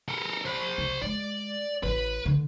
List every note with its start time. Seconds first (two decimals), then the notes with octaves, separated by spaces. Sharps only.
0.08 A4 A#4
0.46 C5 B5
0.78 C2
1.02 G#3 D5
1.83 A1 B4
2.25 D3